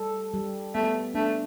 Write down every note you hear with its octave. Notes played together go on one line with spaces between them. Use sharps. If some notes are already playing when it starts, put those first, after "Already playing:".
Already playing: G3 A4
G3
A3 B3
A3 D4